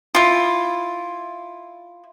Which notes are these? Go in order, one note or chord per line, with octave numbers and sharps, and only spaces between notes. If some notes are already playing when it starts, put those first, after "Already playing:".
E4 F4